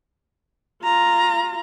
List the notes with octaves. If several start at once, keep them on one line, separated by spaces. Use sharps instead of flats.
F4 A#5